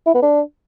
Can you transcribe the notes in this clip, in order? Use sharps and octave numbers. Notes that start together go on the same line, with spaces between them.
E4
B3
D4